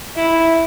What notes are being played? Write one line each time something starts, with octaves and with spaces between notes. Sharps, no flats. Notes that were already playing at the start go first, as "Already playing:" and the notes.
E4